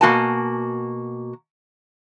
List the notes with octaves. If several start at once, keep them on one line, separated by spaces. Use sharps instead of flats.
B2 A#3 F#4 G#5 A5